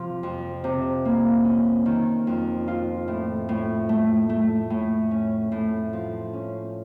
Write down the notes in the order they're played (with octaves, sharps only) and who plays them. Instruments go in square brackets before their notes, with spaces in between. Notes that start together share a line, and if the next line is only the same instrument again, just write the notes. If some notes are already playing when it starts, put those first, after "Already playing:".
Already playing: [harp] C3 F3
F2
C3
A#3
C#4
D#3
F2
F4
A2
A2
A3
A3
A2
C#4
A2
F3
C#4